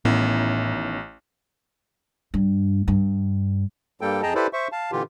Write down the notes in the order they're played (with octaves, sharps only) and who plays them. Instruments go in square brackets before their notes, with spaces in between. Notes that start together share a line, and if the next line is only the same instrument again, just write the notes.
[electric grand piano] A1 [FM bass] A2 [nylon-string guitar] D#3 C#4 E4 [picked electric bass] B3
[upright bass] G2
G2
[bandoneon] G2 G3 A#3 A4 G5
F2 G#4 D#5 G5 A5 A#5
E4 G4 A4 B4 C5 D5
C5 E5 C#6
F5 A5
A#2 D3 E3 F4 G4